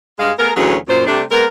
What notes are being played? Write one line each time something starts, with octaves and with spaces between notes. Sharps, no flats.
G2 G#3 F5
A3 B3 G#4 A#4
D2 A#2 E3 F#3 C#4 G#4
F#2 A#2 C5
C3 G3 A3 D4
G#3 A#3 B3 A#4